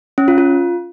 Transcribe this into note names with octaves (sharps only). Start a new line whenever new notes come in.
C#4
F4
F4